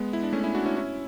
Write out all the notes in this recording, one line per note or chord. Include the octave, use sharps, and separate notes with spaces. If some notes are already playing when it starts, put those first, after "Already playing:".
Already playing: G#3 B3
E4
D4
A3 C#4
C#4 E4
D4 F#4
C#4 E4
C#4 E4